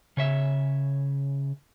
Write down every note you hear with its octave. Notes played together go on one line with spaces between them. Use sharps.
C#3 C#5 E5